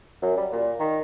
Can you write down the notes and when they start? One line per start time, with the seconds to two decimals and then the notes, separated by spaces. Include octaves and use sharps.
0.22 F#2
0.37 G3
0.52 A#2
0.79 D#3